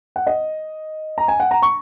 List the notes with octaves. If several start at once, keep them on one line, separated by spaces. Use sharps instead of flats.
F#5
D#5
A#5
G#5
F#5
A#5
C#6